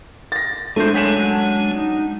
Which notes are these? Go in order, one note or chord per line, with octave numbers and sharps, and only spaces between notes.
A6 A#6
A2 G#3 A3 D4 C5
F#3 C#4 F#5 G#5 B6 E7
D#4